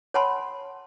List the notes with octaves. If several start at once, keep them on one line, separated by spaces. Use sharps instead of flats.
C#5 F#5 G#5 A5 B5 C6